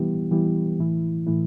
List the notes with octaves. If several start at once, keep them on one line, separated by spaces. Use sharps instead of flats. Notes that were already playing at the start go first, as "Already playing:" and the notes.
Already playing: E3 G3 B3 E4 G4
E3 G3 B3 E4 G4
A2 E3 A3 E4
A2 E3 A3 E4